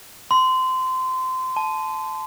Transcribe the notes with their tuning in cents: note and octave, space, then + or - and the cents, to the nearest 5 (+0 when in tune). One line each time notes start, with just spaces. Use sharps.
C6 -25
A5 -20